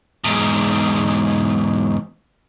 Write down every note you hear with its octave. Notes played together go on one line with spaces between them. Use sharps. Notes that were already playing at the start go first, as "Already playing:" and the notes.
E2 G#2